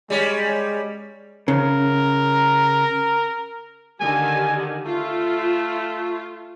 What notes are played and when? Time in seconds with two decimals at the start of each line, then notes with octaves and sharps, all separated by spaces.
0.10 G3 G#3 C#4
1.48 C#3 A#4
4.01 D3 D#3 G4 G#5
4.85 A3 F4